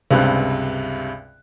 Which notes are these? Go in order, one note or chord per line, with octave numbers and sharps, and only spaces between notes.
C#2 G2 C3 F#6